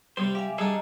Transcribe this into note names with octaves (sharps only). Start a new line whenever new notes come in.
C3 G3 C5
G4 E5 F5 G#5
G3 D4 G#4 A4 D#5 A#5